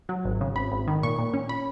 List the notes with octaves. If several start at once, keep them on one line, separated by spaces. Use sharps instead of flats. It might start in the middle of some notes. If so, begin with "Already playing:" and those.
F#3
G#1
C#3
G#1 B5
G#1
D#3
A#2 C#6
A#2
C#4
B5